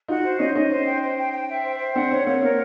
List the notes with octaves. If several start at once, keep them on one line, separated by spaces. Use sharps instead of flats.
D#4 F4 F#4
C5
C#4 D#4 D#5
C#4 D#4 D#5
C5
G5
C5
G5
G5
E5
C5
C5
C4 D4 F#5
C4 D4 C#5
A#3 C4 C#5
A#3 C4 A#4